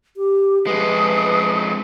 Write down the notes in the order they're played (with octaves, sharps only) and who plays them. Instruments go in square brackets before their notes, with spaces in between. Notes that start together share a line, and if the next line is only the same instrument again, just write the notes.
[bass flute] G4
[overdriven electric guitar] F2 G#3 [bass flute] B4 [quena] D#6